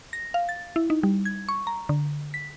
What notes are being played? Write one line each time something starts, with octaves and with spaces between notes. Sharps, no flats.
A#6
F5
A6
E4
D#4
G3
G#6
C#6
A#5
D3
B6